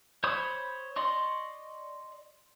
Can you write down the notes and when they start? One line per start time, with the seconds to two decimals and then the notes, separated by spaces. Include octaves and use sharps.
0.24 C5 C#5 B5 C#6 D#6
0.96 D5 D#5 C6 C#6